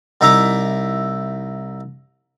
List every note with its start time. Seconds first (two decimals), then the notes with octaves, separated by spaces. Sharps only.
0.21 C2 D#4 E4 E5 A#5 D6